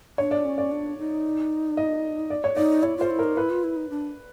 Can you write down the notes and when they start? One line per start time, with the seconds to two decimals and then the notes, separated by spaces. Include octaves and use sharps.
0.18 D4 C#5
0.31 D5
0.45 C#4
0.58 D5
0.72 D4
0.98 D#4
1.77 D#5
2.30 D5
2.44 C#5
2.57 D#4 D5
2.83 E4 C#5
2.97 F4 C5
3.11 E4
3.19 D#4 A#4
3.36 E4 B4
3.50 F4
3.64 E4
3.76 D#4
3.90 D4